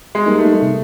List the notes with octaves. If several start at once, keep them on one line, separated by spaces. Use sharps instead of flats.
G#3
G3 A#3 D#4
A3
C3